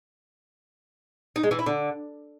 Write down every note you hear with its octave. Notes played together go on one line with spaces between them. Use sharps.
D#4
G#3
E3
E4
D3